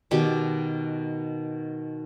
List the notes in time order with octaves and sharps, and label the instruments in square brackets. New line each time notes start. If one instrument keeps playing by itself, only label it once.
[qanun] B2 D#3 G4 A5